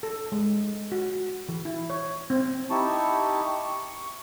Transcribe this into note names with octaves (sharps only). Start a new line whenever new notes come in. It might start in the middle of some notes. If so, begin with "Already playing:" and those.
A4
G#3
F#4
E3
E4
C#5
C4
D#4 E4 G4 A5 C#6
C#6